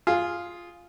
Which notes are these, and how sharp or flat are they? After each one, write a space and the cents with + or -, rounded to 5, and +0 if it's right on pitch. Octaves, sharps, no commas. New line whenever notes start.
F4 +0 G#4 +0